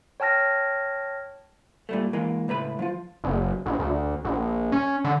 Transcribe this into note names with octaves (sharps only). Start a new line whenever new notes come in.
C#5 G5 A5 F6 A#6
A#2 G3 A3
E3 G#3 A#3
C#2 A2 B4 B5
F3 F4
F#1
A#1
D2
A#1
C#4
D3